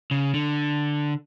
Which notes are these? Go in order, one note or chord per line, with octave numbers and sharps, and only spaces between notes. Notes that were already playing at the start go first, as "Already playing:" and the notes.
C#3
D3